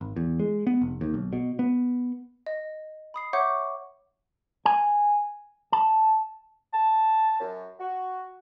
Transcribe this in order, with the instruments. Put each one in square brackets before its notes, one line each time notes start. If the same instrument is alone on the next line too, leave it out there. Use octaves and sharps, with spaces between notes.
[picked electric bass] G#1
E2
G#3
B3
F1
D#2
B1
B2
B3
[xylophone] D#5
B5 D#6 C7
C#5 E5 F#5 C#6 D6 G6
[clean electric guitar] G#5
A5
[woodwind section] A5
F#2
F#4